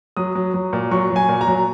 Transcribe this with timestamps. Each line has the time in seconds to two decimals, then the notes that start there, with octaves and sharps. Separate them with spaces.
0.17 F#3 D#6
0.35 F#3
0.54 F#3
0.73 A#2
0.91 F#3 C#6
1.10 F#3
1.16 G#5
1.29 A#2
1.41 A#5
1.47 F#3